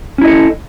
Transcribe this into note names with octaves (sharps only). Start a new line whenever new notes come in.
C#4 E4 A4 D#5